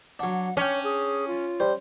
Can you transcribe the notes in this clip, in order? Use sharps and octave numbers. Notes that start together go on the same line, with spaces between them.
F#3 D4 F#5
C#4 D4 C#5 G5
G#4
F4
G3 C5